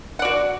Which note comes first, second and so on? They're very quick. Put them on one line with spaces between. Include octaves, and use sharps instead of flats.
F#5 D5 F#4